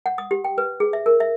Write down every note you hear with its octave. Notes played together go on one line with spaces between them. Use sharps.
F#5
D#6
G4
G5
B4
G#4
E5
A#4
E5